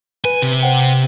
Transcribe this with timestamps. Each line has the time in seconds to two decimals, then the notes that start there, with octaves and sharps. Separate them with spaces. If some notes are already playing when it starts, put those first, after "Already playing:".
0.25 B4 G#5
0.42 C3
0.62 C5 F#5 G5